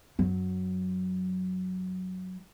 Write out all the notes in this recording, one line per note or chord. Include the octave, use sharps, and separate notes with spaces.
F#2 F#3